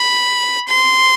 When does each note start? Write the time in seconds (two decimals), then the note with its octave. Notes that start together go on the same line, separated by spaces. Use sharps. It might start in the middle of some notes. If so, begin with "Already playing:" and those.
Already playing: B5
0.69 C6